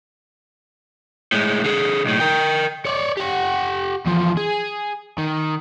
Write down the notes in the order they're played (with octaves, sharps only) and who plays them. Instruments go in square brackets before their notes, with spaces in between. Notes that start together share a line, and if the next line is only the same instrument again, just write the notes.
[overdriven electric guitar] A2 G#3
D3 G#4
B1 A2
A#4 G5
C#5 D5
G4 F#5
E2 F3
G#4
D#3